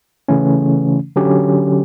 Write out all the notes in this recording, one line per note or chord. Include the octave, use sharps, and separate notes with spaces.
C#3 E3 A3 C#4
D3 F#3 C#4 G4